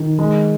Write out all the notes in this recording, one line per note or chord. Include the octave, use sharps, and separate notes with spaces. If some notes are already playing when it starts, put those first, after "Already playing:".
Already playing: D#3
G#3